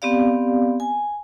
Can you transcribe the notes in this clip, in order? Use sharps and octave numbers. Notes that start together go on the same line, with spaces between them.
B3 C4 G4 D5 F5
G#5